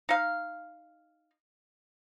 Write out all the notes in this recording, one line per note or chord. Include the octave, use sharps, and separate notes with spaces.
D#4 F5